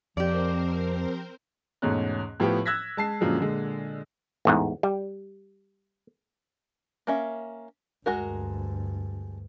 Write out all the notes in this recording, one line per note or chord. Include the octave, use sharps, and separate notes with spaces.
F2 F3 C4 G4 A#4 C5 D5
E2 G#2 B2 A3 C#4 F#6
A2 F3 B3 G4
E6 F#6 G#6 A#6 B6
G#3 A5 C7
F#2 A#2 D3 F3 F#3 G#3
A#2 D3 G#3
A1 E2 G#2
G3
A#3 C#4 E5
D2 G2 G#3 F#4 A#4